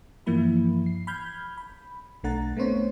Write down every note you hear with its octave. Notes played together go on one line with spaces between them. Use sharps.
G2 E3 F3 A#3 E4 B5
C7
B5 F6 G6 G#6
B5
B1 A3 D4 F#5 A#5 A6
A3 B3 C4 C5 C#5